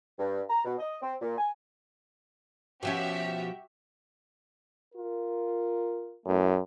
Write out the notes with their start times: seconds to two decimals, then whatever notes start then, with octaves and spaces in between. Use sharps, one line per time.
0.19 G2
0.50 A#5
0.65 B2
0.78 D#5
1.02 C4
1.21 A#2
1.38 G#5
2.83 B2 F3 C#4 F#4 G4 E5
4.95 F4 A#4
6.26 F#2 E3 A3